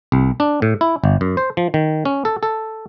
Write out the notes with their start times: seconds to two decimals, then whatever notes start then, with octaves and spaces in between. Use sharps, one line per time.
0.12 C2
0.40 D4
0.62 A2
0.81 E4
1.04 G1
1.21 F#2
1.37 C5
1.57 F3
1.74 D#3
2.05 C#4
2.25 A4
2.43 A4